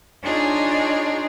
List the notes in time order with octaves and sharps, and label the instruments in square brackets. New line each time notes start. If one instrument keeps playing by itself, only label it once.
[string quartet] D4 D#4 F4 G#4 C#5